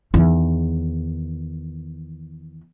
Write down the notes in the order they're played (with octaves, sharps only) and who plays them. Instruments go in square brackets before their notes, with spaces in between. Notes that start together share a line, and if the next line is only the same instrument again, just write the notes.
[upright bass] E2 D#3